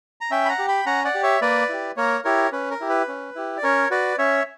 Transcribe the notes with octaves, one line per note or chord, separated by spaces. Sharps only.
A#5
C#4 E5 G5
B5
F#5 A#5
G4
G5 B5
C#4 F#5 A#5
D5 F#5
G4
C#5 E5
A#3 B4 D5
E4 G4
A#3 A#4 C#5
E4 G4 A#4 C#5
C#4 B4
A#4
E4 G4
B4
C#4
E4 G4
D5
C#4 A#4 C#5
F#4 B4 D5
C#4 C#5 E5